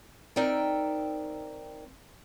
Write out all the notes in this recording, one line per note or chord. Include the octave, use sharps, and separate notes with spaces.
C4 D#4 A#4 D5 E5 G5